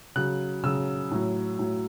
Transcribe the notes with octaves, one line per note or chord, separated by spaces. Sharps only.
C#3 F#3 F#6
C#3 F#3 E6
A2 F#3
A2 F#3